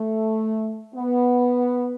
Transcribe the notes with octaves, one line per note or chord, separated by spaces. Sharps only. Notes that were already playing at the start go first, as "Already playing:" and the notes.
Already playing: A3
B3